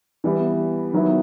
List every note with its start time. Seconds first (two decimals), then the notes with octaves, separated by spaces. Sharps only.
0.24 E3 G3 B3 E4
0.93 D#3 F#3 B3 E4